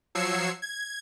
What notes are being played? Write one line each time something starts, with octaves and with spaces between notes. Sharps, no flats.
F3 F#3 E6 G#6 C7 C#7
G#6